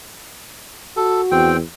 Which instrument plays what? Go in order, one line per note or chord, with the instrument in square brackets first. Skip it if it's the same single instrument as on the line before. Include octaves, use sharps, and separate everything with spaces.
[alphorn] F#4 [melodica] A4
[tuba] E2 [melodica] C4 G5